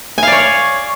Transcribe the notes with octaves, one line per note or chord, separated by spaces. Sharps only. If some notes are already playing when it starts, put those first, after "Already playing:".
C#5 D5 F5 G#5